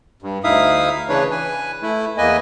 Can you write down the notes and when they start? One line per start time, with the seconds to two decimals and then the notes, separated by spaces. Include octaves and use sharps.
0.22 G2
0.44 D2 D#4 E4 E5 F5 D#6
1.09 C#3 E3 D4 B4 C#5
1.31 B4 G#5
1.82 A3 E4
2.18 E2 A#3 B4 D#5 G#5